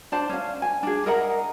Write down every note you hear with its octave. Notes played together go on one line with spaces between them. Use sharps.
D4 C5 A5
C#4 F5
G#5
D4 G#4
A#4 D#5 F#5 A#5